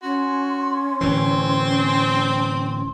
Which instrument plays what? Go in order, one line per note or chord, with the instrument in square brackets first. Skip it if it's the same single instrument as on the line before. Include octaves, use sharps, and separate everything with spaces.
[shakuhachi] C#4 [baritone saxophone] F#4 [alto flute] C6
[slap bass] D1 E3 [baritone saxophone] C4